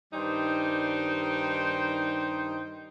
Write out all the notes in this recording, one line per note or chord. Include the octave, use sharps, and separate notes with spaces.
G2 D#3 G3 D#4 C5 G5